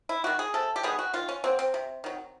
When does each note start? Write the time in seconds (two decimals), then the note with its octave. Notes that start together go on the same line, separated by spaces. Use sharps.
0.09 E4
0.24 D#3 G3 F#4
0.39 G#4
0.54 C3 A4
0.76 G4
0.83 D#3 G3 B3 G#4
0.99 F#4
1.14 D#3 F4
1.29 C#4
1.44 F#3 A#3 C4
1.59 C4
1.74 C3
2.04 D#3 F#3